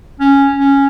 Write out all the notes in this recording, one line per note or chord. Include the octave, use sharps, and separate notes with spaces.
C#4
C#4